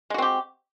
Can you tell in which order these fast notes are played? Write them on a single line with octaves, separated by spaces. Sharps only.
G#3 F#4 C4 G4